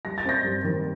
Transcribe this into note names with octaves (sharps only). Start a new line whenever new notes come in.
G3 A#6
A6
C4 G6 A#6
G2
D#3